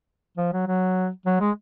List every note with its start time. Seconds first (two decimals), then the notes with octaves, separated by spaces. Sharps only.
0.38 F3
0.53 F#3
0.67 F#3
1.26 F#3
1.41 G#3